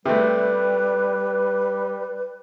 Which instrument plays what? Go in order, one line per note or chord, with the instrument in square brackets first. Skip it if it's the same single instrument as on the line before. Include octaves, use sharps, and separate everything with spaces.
[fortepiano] C3 A3 [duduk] G3 [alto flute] B4